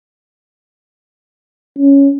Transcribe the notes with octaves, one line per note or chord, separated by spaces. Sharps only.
C#4